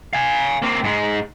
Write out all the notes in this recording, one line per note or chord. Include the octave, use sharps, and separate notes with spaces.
F5 G#5
A#3 C4
G#2 G#3